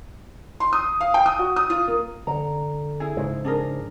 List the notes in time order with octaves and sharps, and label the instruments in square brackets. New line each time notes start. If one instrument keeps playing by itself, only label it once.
[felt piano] C6
D#6
F5
G5
D#6
F#4
D#6
F4
A#3
[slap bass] D3 [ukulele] A#5
[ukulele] E4 G#4
[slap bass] G#2 C#3 F3
[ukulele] D4 G#4 A#4